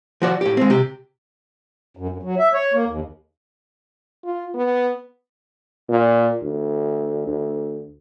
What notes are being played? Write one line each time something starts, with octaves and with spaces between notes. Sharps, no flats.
F3 F#4 D5
A2 G4
G#3 C4
C3 G4
F#2
F#2
F#3
E5
C#5
A#3
D#2
F4
B3
A#2
D2
D2